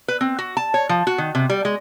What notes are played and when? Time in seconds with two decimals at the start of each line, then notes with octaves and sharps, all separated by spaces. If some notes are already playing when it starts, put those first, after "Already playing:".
0.08 B4
0.21 C4
0.39 F#4
0.57 A5
0.74 C#5
0.89 F3
1.07 F#4
1.18 D#3
1.35 C3
1.50 G3
1.65 G#3